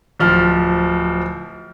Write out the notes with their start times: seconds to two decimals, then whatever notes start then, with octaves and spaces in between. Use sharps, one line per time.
0.20 D1 F3 F6